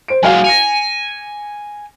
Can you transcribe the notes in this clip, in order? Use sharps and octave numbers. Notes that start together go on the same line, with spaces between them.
C5 D7
F#3 G#3 F#4 F5 G#5
G#5 A#6 C#7 F7